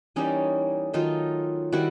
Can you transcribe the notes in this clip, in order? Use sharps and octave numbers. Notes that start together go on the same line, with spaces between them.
E3 G3 A#3 C#4 D#4
D#3 F#3 A3 D#4 F4
D#3 G3 E4 F#4